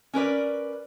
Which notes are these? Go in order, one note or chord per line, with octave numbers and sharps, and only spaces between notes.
C#4 A#4 B4 D5